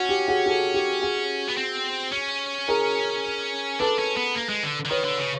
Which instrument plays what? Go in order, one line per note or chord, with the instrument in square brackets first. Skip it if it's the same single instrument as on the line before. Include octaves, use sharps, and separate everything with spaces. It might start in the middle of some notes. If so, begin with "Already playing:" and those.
Already playing: [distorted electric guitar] C#4 [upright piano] F#4
[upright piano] G4
F#4 G#4
G4 A4
G4
F#4 G#4
[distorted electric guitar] B3
C4
C#4
[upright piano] G#4 A#4
[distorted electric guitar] D4 [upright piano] A4 B4
[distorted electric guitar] C#4
B3
A#3
G#3
D3
D3
[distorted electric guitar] D#3 [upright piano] B4 C#5
[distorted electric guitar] D3
C#3